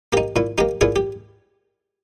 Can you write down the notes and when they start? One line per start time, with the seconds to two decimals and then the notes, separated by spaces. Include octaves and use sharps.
0.13 A#3 D#4 G4
0.36 A#2 E4
0.58 A#3 D#4 G4
0.81 A#2 E4 G#4
0.96 G4